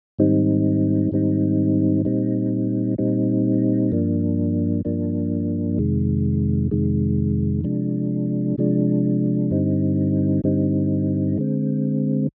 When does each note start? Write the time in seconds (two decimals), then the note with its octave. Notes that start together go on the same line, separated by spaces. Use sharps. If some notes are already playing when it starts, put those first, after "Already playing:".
0.19 G#2 D#3 G3 C4 D#4
1.12 G#2 D#3 G3 C4 D#4
2.05 A#2 G3 C4 D#4
2.98 A#2 G3 C4 D#4
3.92 G2 F3 A#3 D4
4.85 G2 F3 A#3 D4
5.78 F2 C3 D#3 G#3
6.71 F2 C3 D#3 G#3
7.64 C3 F3 G#3 D4
8.58 C3 F3 G#3 D4
9.51 G2 D3 G3 C4 D#4
10.44 G2 D3 G3 C4 D#4
11.38 D3 G#3 C4